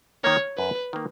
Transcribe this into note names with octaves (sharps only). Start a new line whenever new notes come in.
D#3 A#3 C#5
F#2 B4
D#3 A#3